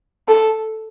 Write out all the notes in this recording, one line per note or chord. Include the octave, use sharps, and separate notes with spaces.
A4